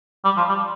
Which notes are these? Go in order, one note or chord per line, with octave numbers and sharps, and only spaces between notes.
G3
F3
G3